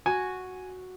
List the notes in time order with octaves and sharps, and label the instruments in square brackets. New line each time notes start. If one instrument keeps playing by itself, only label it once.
[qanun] F#4 [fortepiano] G#5